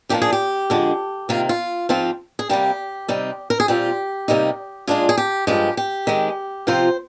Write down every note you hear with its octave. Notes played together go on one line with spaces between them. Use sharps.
A#2 F3 A#3 D4 F4 G4
G#4
G4
F2 D3 G#3 D4
C3 D#3 A#3 F4
F4
G#2 F3 C4 F4
G#4
C3 G3 A#3 G4
C3 G3 C4 D#4
A#4
G#4
A#2 G3 C4 F4 G4
C3 G3 A#3 D#4
A#2 G#3 D4 F4 G#4
G#4
G4
G2 F3 G#3 G4
G4
D#3 G#3 C4
C3 F3 C4 F4 C5